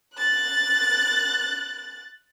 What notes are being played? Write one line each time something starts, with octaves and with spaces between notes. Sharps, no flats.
F#6 A6